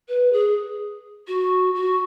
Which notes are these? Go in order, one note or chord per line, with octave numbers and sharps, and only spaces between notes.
B4
G#4
F#4
F#4